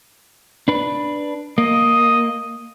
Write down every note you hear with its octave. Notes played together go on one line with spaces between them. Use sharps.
D4 B4
A#3 D#5